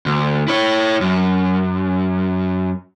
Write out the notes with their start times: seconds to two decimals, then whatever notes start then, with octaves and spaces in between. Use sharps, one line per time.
0.06 D2
0.48 E4 C#5
1.01 F#2